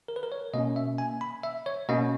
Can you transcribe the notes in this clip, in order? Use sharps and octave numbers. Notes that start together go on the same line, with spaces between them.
A#4
B4
A#4
C#5
B2 A#3 C#4 D#5
E5
G#5
B5
E5
C#5
B2 A#3 C#4 D#5